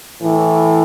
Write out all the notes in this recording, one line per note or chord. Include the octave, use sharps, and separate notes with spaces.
A2 E3